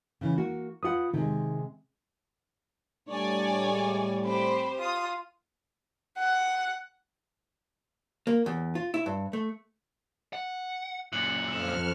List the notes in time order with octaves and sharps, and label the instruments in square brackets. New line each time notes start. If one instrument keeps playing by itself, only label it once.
[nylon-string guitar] C#3 E3 C#4
A#3 F#4
[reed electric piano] F4 D#6 [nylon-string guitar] B4 F#5
[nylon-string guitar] C3 G#3 [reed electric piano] D#3
[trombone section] A2 G3 [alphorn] D4 [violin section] C#5 D5 G#5
[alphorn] G#3
[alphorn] C4 [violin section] G4 C5 [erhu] B5
[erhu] F4 [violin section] D#6
[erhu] F#5
[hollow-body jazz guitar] A#3
E2
F4
E4
G2
A3
[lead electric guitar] F#5
[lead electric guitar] F#2 A#2 [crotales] F#6 C#7 F#7
[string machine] F2 F6 [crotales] E6 E7